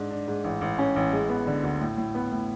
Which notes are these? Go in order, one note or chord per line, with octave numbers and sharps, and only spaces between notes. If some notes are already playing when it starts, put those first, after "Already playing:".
Already playing: G#2 D4
D4
G#2
A1
A1
C#4
A1
G#3
B3
D3
D2
A2
A2
B3
A2